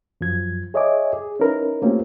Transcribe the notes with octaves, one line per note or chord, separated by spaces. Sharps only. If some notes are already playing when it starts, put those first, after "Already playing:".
F#2 F3 G#6
G#4 C#5 D#5 E5 G#5 D6
G#4
C#4 D#4 E4 A#4 B4
A3 A#3 C4 C#4 F4 G4